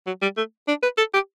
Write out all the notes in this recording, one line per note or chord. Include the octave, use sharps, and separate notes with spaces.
F#3
G3
A3
D4
B4
A4
G4